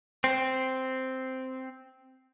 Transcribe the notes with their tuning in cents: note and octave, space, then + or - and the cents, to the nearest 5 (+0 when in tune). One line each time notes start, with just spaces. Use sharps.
C4 -5